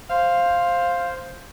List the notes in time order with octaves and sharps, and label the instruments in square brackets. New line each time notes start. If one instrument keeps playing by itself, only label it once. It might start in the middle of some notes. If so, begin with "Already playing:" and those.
[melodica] C5 [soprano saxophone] F5